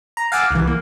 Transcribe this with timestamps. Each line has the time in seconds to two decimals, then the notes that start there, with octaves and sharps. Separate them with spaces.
0.17 A#5
0.32 F5 F#5 G#5 A5 D6 E6
0.51 C2 E3
0.67 A#3